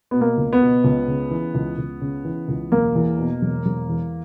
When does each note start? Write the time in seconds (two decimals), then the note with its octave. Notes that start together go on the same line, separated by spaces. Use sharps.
0.11 B2 B3
0.21 A#3
0.37 C#2
0.53 B3
0.61 B2
0.84 C#2
1.08 C#3
1.31 E3
1.54 C#2
1.77 C#2
2.01 C#3
2.25 E3
2.48 C#2
2.72 E1 A#3
2.95 E2
3.19 B2
3.42 E1
3.66 E1
3.89 E2